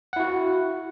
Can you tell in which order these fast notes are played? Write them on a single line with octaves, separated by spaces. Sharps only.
F#5 E4 F#4